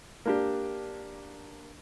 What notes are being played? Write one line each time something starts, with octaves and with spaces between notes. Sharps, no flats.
A#3 D4 G4